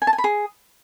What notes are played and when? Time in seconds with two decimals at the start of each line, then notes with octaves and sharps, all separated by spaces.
0.02 G#5
0.07 A5
0.13 G#5
0.18 B5
0.24 G#4